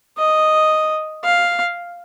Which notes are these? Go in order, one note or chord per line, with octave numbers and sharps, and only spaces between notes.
D#5
F5